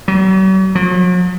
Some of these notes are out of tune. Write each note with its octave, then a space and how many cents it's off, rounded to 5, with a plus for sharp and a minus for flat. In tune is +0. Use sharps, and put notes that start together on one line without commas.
F#3 +45
F#3 -45